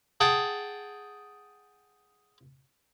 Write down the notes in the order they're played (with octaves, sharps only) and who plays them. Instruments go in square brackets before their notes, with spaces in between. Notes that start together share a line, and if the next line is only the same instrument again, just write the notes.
[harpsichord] G#4 F#5 G5 A5